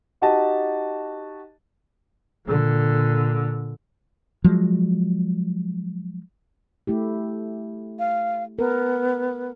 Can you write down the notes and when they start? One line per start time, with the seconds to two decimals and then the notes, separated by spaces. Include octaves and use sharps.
0.21 D#4 F#4 G4 D#5 A5
2.46 A#2 D3
4.44 F3 F#3 G#3
6.87 A3 E4 G4
7.99 F5
8.59 B3 A#4